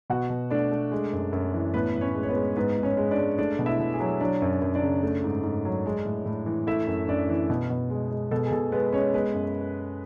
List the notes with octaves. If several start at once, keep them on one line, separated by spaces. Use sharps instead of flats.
B2 F#4 F#5
B2
A3 D4 D5
A3
G#3
F#2
F#2
E3
A2 B3 B4
A2
C#4 C#5
G#3
C#5
B3 B4
G#3
G#2 B3 B4
G#2
C#4 C#5
G#3
D4 D5
G#3
A3 D4 D5
B2
E4 E5
B2
G#4
F#3
F#3 D4 D5
F#2
F#2
D4 D5
C#3
A3
G#2
G#2
F#3
G#3
A2
A2
E3
A3 E4 E5
F#2
F#2 D4 D5
E3
B2
B2
G#3
G#3
B2 A4
G#4
B2 A4
G#3 B3 B4
G#3 C#4 C#5
G#3 B3 B4
F#2